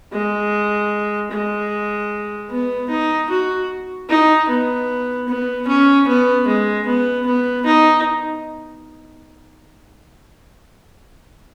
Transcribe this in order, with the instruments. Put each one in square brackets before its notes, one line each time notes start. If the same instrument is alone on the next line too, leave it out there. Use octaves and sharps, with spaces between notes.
[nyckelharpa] G#3
G#3
B3
D#4
F#4
D#4
B3
B3
C#4
B3
G#3
B3
B3
D#4